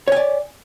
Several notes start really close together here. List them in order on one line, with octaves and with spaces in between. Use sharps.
C#5 G#5 D5